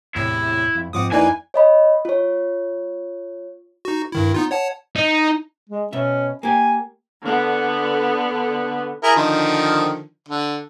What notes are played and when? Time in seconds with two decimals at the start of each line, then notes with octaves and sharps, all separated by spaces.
0.16 E2 A2 C3 E4
0.75 F2
0.93 G#2 F3 C4 F#5 D6 D#6
1.12 F2 A#3 D#4 E4 B4 D5 G#5
1.54 C#5 D#5 B5
2.05 F4 C#5
3.85 D#4 F#4
4.12 G2 D#3 E4
4.34 B3 D#4 F4
4.51 C#5 F#5 A5
4.96 D#4
5.69 G#3
5.93 B2 C#4 E5
6.43 A#3 G4 G#5
7.22 D3 B3
9.03 E4 G#4 A#4
9.16 D3 D#3 F3
10.29 D3